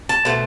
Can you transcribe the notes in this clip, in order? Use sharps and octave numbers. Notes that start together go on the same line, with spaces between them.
A5
B2 A3 C4